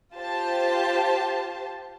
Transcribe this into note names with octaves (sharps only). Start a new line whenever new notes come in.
F4 G4 C5 A5